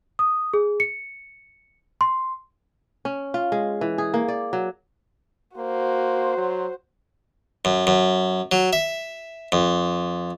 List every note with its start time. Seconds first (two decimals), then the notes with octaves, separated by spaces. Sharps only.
0.19 D#6
0.54 G#4
0.80 C#7
2.01 C6
3.05 C#4
3.34 F4
3.52 G#3
3.81 E3
3.98 G#4
4.14 A#3
4.28 D5
4.53 F#3
5.57 A#3 F#4 C5
6.37 F#3
7.65 F#2
7.87 F#2
8.52 F#3
8.73 E5
9.52 F2